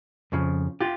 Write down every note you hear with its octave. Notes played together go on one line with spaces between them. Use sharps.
F2 C#3 F3
F4 G4